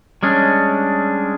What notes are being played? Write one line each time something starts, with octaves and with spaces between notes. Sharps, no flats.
G3 G#3 C#4 D4